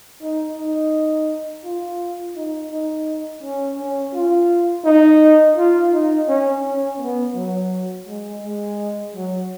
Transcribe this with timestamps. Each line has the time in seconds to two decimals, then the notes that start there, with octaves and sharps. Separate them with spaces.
0.22 D#4
0.56 D#4
1.65 F4
2.36 D#4
2.71 D#4
3.43 C#4
3.78 C#4
4.14 F4
4.85 D#4
5.57 F4
5.93 D#4
6.28 C#4
6.64 C#4
7.00 B3
7.35 F#3
8.07 G#3
8.43 G#3
9.15 F#3